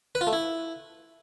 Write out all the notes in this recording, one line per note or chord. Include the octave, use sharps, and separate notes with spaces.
B4
F4
A3
E4